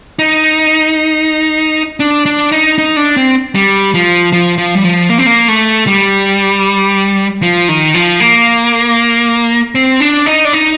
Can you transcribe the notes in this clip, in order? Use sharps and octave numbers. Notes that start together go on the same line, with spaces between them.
D#4
D4
D4
D#4
D#4
D4
C4
G3
F3
F3
F3
G3
F3
A#3
C4
A#3
A3
G3
F3
D#3
F3
A#3
C4
D4
D#4
D4
D#4